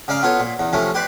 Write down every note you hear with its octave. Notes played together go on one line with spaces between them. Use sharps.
C#3 D5 F5 A#5
B3 F4 A4 C#5
A#2
E2
C3 F3 A3 C#4
G4 B4 D5 C6